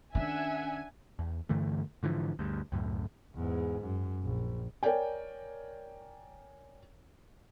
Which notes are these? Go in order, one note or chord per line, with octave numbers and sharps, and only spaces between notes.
D#3 C#4 D4 E5 F#5 G#5
E2
G2 D3 E3 A3
G#2 D3 E3 F3
D2 G2
C#2 F#2 A2
E2 G#2
F#2
A#1
A#4 C#5 D5 G5 G#5